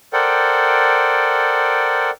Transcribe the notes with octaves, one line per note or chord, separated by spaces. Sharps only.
A4 A#4 C5 D5 F#5 G5